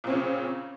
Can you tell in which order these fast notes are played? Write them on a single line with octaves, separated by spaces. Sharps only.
A#2 C4 C#4 C#3